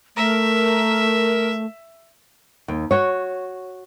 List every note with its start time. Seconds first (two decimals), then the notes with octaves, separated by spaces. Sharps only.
0.17 A3 A#4 E5
2.68 D#2
2.91 F#4 C#5